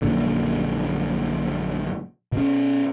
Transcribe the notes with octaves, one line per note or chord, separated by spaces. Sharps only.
A#1 F#2 A#2 D3
B2 C#4